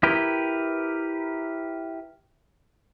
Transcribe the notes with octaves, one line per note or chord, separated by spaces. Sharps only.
E4 G4 A#4 B4 G5